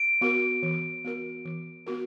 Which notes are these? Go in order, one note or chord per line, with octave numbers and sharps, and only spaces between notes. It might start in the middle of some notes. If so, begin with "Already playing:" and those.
Already playing: D7
B3 F#4 A#4
E3
B3 F#4 A#4
E3
B3 F#4 A#4